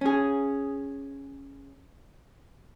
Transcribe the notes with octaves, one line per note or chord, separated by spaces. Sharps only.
C#4 G#4